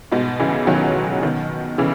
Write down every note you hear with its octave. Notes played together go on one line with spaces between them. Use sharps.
G#2 B2
C#3 E3
D#3 F#3
B2 D#3
C#3 E3